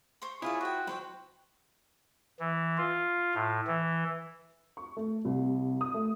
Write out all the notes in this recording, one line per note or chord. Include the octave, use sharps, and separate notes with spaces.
C5 C6 C#6
E4 F4 G#4 C#5 D5
F#4 C5 G5
F#3 B4 C5 G5
E3
F4
A2
E3
C#6
A3
C2
D#6
A3